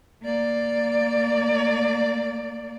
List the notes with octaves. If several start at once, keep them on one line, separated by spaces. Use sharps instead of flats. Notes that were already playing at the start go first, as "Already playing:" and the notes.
A#3 D5